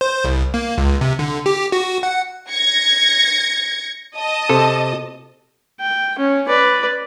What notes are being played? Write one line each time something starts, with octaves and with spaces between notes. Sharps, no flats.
C5
C2
A#3
C#2
C3
D3
G4
F#4
F#5
G#6 A#6 C#7
D#5 A5 D#6
C3 A4
G5
C#4
B4 D5